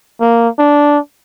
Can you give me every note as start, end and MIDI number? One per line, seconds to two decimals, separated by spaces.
0.20 0.48 58
0.59 0.99 62